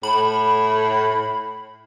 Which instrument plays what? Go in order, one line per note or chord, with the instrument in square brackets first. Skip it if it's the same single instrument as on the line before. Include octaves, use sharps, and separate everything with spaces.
[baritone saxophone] A2 [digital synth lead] B5